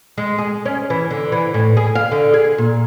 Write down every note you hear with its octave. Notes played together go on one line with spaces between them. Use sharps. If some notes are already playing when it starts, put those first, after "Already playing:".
G#3
G#4
C#4
E3
D3
E3
A2
G#4
F5
D3
G#4
A#2